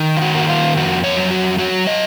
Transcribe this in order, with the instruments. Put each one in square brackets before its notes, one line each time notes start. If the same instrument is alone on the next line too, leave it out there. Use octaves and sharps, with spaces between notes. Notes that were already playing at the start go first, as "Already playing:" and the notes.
Already playing: [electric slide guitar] D#3
F4
F#4
A#3 F#4
F4
F2 F#4
C#5
F#3
F#4
F#3 F#4
D#5